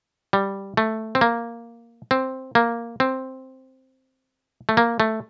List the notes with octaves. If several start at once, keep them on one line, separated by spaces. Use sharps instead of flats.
G3
A3
C4
A#3
C4
A#3
C4
A3
A#3
A3